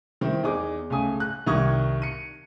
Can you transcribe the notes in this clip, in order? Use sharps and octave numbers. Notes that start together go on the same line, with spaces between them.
D#3 C4 E4
E2 D#4 G#4 D6
C#2 A3 G#5 D#6
F#6
C2 D#3 C#6 D#6 G#6
C#7 D#7